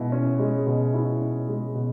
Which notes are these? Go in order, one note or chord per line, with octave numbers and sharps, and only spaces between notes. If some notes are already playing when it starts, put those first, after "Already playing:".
Already playing: B2 G#3 E4
C#4
G#3
B2
E4
C#4
G#3
B2